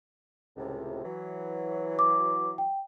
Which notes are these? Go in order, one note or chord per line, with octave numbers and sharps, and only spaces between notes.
C#2 A2 C3
E3 F#3
D6
G5